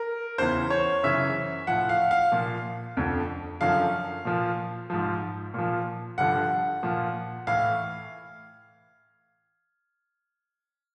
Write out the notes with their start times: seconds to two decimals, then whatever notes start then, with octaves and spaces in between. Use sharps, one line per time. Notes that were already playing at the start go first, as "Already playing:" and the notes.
Already playing: A#4
0.38 E2 C#3 E3 C5
0.70 C#5
1.03 F#2 C#3 E3 E5
1.67 A2 F3 F#5
1.89 F5
2.11 F5
2.32 A#2 F3
2.97 F2 D3 F3
3.61 F#2 D3 F3 F5
4.25 A#2 F3
4.90 G#2 F3
5.54 A#2 F3
6.18 G2 D3 F3 F#5
6.83 A#2 F3
7.47 A2 E3 F5